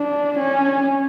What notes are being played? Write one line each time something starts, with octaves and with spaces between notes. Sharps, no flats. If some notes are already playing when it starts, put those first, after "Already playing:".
Already playing: D4
C#4